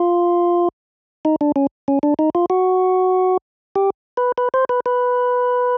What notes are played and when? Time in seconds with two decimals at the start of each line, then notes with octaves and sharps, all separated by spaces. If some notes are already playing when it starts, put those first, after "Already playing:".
Already playing: F4
1.25 D#4
1.41 D4
1.56 C#4
1.88 C#4
2.03 D4
2.19 D#4
2.35 F4
2.50 F#4
3.76 G4
4.17 B4
4.38 B4
4.54 C5
4.69 B4
4.86 B4